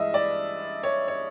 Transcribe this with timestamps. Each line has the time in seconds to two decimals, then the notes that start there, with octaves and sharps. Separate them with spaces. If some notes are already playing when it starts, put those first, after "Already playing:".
Already playing: G2 E3 G#3 D#5 E5
0.14 D5
0.83 C#5
1.08 C#5